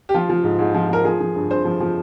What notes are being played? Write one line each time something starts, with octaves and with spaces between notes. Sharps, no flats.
G4
F3 F4
F3
G#2
G#2
F3
F3 A#4
F3 G#4
F3
G2
G2 C5
F3
F3